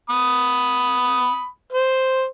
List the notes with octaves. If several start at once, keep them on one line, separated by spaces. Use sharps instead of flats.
B5 D#6
C5